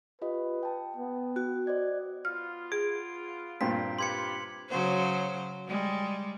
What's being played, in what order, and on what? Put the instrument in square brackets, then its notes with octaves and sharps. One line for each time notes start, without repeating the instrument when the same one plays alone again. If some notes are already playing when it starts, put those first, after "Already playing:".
[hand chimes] F4 G4 D#5 [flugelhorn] B4
[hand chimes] G5 A5
[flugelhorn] B3
[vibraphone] F#4
[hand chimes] C5 D#5 G#6 [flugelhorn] D5
[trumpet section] B3 F4 [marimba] F6
[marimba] G#4 [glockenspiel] D7
[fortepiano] G2 A#2 C4 [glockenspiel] B6
[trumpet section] F4 G4 B4 [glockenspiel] C6 G#6 C#7
[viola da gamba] C#3 F#3 C5
G3 G#3